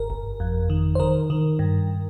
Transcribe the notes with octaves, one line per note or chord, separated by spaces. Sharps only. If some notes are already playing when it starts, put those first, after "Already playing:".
Already playing: G1 A#4
G1
F2
D#3
C5
D#3 A#4
D#3
G2